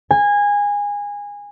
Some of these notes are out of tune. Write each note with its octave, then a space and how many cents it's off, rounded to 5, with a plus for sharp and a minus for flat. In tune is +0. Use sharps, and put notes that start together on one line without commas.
G#5 -20